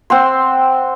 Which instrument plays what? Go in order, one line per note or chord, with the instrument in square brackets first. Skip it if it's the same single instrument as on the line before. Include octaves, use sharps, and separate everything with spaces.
[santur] C4 F#5 C6